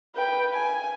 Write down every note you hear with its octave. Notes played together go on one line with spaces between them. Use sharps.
B4 G5
G#5